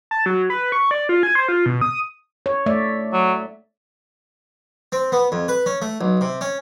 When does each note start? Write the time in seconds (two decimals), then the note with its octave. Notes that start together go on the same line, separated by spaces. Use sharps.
0.11 A5
0.26 F#3
0.50 B4
0.72 C#6
0.91 D5
1.09 F4
1.23 G#5
1.35 C5
1.49 F4
1.66 B2
1.81 D#6
2.46 C#5
2.66 A3 D5 E5
3.13 F#3
4.92 C4
5.12 B3
5.32 F2
5.48 B4
5.66 C#4
5.82 A3
6.01 B1
6.21 C3
6.41 C#4